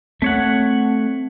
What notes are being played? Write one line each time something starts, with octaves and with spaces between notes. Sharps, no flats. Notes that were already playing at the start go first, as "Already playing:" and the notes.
A3 C4 C#5 F#5